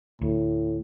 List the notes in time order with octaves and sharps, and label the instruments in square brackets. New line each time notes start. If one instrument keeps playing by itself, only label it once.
[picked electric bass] D2 [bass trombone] A2